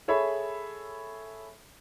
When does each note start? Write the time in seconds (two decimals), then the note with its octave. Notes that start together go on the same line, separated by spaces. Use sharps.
0.08 G#4 A4 C#5 E5 B5